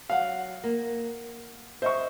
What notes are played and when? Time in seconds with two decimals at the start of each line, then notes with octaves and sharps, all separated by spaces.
0.10 F#3 F5 F#5
0.64 A#3
1.82 C5 D#5 E5 C#6